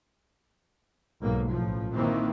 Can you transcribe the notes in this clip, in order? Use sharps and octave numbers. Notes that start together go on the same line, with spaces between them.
B1 G#2 A#3
A1 F3
A#2 D#3 E3 A#3 C4